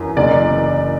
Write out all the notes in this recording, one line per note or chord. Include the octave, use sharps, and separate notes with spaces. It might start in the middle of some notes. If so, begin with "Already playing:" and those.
Already playing: F#2 E3
F#1 D5